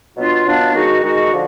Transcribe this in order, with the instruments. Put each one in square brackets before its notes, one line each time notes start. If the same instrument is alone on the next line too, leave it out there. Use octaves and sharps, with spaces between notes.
[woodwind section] B2 F#3 B3 D4 F4
B2 F#3 B3 D4 F4
D#3 G#3 D#4 F#4
D#3 G#3 D#4 F#4
D3 F3